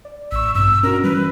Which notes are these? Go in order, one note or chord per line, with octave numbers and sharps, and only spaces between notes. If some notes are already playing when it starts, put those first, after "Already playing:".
D5
A1 C#6 E6
G2 B2 E6
C#4 D4 F#4 A#4
E3 G3 B4